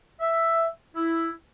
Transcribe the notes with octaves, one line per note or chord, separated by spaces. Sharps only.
E5
E4